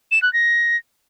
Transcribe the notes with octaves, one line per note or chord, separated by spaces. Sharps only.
E7
F#6
A#6